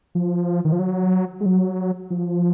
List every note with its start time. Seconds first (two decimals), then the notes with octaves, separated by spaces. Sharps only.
0.15 F3
0.65 D#3
0.72 F3
0.79 F#3
1.41 G#3
1.46 F#3
2.10 F3